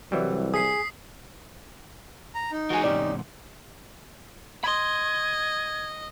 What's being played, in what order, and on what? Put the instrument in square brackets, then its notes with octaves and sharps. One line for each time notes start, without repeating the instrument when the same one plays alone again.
[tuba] C2 [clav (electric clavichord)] E3 F#3 G3
[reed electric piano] G#4 G#5 [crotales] D#6 B6 C7
[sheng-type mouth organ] A#5
D#4
[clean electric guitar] E3 G#3 C#4 [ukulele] F#4 G#4
[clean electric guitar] E2 G#2 C3 [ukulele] C#4 G4 D5
[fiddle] D#5 [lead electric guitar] B5 C6 [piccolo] G#6